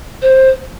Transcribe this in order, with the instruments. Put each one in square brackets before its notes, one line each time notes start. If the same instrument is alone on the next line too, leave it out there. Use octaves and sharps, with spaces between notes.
[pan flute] C5